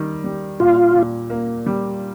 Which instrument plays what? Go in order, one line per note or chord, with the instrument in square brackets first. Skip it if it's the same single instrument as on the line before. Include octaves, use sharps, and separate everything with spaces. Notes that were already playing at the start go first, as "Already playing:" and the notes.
Already playing: [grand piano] D#3 G3
G3
[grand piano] A#2 [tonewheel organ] F4
[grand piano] A#2
A#3
G3